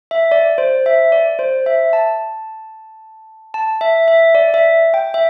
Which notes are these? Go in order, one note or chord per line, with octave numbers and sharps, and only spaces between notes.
E5
D5
C5
E5
D5
C5
E5
A5
A5
E5
E5
D5
E5
G5
E5